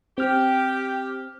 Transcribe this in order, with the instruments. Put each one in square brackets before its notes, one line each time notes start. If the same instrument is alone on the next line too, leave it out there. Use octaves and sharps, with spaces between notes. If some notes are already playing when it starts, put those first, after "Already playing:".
[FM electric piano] C4 F6 [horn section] G4